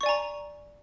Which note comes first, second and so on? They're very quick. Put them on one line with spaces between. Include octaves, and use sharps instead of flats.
C#6 D5 G#5 A#5